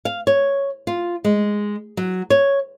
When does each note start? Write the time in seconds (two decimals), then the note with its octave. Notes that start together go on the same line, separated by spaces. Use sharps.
0.05 F5
0.27 C#5
0.87 F4
1.24 G#3
1.97 F#3
2.30 C#5